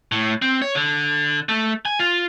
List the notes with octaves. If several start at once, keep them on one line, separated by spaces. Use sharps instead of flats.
A2
C4
C#5
D3
A3
G#5
F4